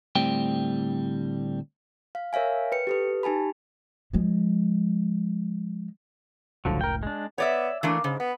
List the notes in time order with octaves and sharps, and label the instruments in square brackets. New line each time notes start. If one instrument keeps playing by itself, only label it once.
[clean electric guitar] D2 A2 G3 C4 G5
[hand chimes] F5
A#4 C#5 E5 F5 G#5
B4 G5 C#7
G4 A4 B4
D#4 G4 G#5 A5 B5
[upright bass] F3 G#3
[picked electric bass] F#1 C#2 A2 [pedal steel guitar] D3 F3 F#3
[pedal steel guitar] A#4 G5
G#3 D4
[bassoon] B3 [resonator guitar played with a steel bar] C#5 D5 E5
[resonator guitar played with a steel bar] E3 A3 D4 [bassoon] A#3
[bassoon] G#2 [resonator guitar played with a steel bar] C#3
[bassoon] B3 [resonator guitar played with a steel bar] B4